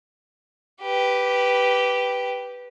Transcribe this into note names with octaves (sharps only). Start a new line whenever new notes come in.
G4 B4